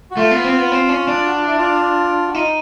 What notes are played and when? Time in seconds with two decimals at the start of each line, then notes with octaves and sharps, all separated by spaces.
0.11 F#4
0.17 A3 F4
0.31 B3
0.45 C4
0.58 B3
0.72 C4
0.89 C#4
1.08 D4
1.26 F#4
1.36 F4
1.46 E4
1.57 F4
2.27 F#4
2.35 D#4 F4